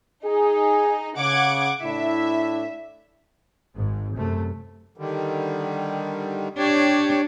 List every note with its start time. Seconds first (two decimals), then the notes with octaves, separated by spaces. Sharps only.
0.24 D#4 G#4
1.16 C#3 F#5 D6 G#6
1.82 A2 D4 E4 E5
3.76 G#1 G#2
4.16 F#2 C3 A3
4.98 D3 D#3 G3
6.58 D4 G4 C#5